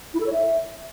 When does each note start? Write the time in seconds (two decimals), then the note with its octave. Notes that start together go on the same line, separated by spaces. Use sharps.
0.14 E4
0.20 A4
0.26 C#5
0.33 E5